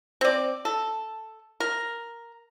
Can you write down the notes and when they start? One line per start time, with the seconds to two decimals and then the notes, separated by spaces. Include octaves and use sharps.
0.21 C4 D5
0.65 A4
1.60 A#4